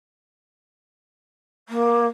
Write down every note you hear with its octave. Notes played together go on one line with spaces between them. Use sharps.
A#3